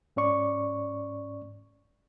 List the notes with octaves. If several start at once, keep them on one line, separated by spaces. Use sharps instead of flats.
G#2 C#4 D5 C#6